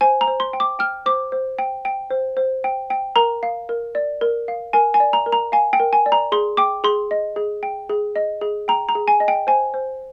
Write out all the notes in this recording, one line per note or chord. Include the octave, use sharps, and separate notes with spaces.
C5 G#5
A#5
C5
C6
G5
D6
G5 F6
C5 D6
C5
G5
G5
C5
C5
G5
G5
A#4 A#5
F5
A#4
D5
A#4
F5
A#4 G#5
G#5
D5
A#5
A#4
A#5
F5 G#5
G5
A#4
G#5
D5
A#5
G#4 C6
G5 D6
G#4 C6
D#5
G#4
G5
G#4
D#5
G#4
G5 A#5
A#5
G#4
G#5
D#5
G5
C5 G#5
C5